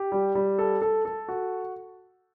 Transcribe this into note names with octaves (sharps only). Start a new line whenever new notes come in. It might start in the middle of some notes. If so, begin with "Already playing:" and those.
Already playing: G4
G3
G3
A4
A4
A4
F#4